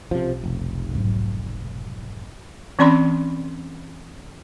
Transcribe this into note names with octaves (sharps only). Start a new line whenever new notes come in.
B1 C3 F3 C#4
F1
G#2 F#3
E3 C4 C#4 D5 B5 C6